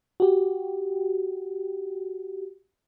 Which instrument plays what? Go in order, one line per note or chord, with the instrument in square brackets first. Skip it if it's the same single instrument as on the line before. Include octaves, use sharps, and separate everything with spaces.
[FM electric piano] F#4 G4